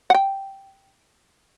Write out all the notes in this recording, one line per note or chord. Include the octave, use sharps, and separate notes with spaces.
F#5 G5